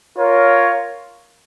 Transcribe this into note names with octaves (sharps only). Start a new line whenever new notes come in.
F4 A#4 C#5